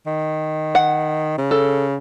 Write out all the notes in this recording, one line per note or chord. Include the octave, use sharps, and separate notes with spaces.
D#3
F#5
C#3
A4